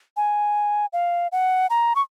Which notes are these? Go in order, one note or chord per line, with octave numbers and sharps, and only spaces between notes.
G#5
F5
F#5
A#5
C#6